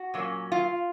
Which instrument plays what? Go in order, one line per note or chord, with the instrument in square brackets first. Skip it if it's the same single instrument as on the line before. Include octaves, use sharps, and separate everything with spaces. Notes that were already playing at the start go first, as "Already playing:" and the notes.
Already playing: [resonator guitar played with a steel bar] F#4
A#2 F#3 A#3 C#4
F4